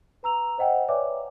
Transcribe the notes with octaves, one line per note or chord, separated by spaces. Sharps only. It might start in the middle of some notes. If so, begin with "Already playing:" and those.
B4 A#5 E6 F7
C5 D#5 F#5 G5
B4 C#5 D5 E5 G#5 D6